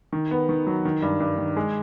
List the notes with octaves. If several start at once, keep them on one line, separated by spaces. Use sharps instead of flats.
D#3
B3
D#3
F#3
D#3
G2
G2
D#3
G#3